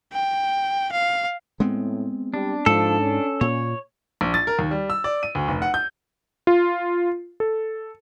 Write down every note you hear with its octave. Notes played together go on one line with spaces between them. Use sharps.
G5
F5
A2 G#3 B3 C4
G3 D4
G#2 F3 A4
C#4
A#2 C#5
A#1
A6
A#4
D#2
G3
E6
D5
D#7
D2
F1
F#5
G6
F4
A4